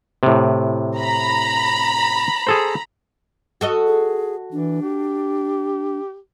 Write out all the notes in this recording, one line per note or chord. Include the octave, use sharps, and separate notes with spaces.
A2 C3
A#5 B5
G#4 A4 C5
F#4 A4 D#5
G#4
E3 D4
G4